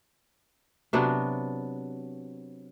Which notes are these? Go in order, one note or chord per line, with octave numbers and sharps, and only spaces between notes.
C3 F#3 B3 D4